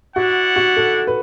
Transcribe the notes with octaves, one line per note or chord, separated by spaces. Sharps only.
E4 F#4 D5 F#5
F#4
A4
B4